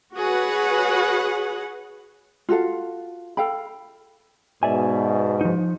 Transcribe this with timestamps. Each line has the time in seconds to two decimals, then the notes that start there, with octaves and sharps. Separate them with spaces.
0.17 F#4 G#4 B4 C#5 F#5
2.49 F4 F#4 A4 F5
3.37 A4 F5 G5 B5
4.63 G#2 B2 D5 E5 G#5
5.41 F3 D#4